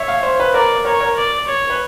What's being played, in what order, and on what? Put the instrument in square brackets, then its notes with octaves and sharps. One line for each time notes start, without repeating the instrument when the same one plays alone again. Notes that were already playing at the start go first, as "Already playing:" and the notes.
Already playing: [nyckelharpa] C#5 [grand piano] E5
[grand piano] F5
C5
B4
[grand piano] A#4 [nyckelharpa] D5
[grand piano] A#4 [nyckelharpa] C#5
[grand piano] A#4
[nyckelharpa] D5
C#5
[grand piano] B4